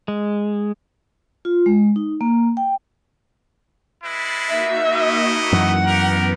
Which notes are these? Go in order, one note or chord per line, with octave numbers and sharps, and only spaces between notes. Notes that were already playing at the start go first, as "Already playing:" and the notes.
G#3
F4
G#3
D#4
A#3
G5
G#3 E4 B4 B5 A6 C7
A#3 D#4 F#4 E5
A3 E4 D#5
F#2 E3 F#5
B3 G4 A#4